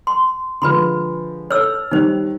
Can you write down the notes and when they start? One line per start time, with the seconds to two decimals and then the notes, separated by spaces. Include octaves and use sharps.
0.07 C6
0.62 D3 F3 G#3 B4 B5 C6
1.51 A4 C#5 E6 F6
1.91 D#3 G3 D#4 C5